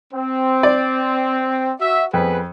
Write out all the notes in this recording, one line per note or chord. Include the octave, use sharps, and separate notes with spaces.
C4
D5
F#4 E5
F2 B3 G#4 B4